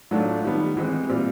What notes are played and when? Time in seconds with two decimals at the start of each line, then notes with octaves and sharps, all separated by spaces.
0.11 A2 F#3 A3 D4 F4
0.44 D#3 G3 B3
0.77 E3 G#3 C4
1.09 A#2 G3 C4 F4